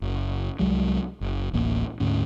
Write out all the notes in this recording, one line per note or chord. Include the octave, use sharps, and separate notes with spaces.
F#1
C2 F#3 G#3
F#1
D1 A1 A#3
D2 G#2 C#4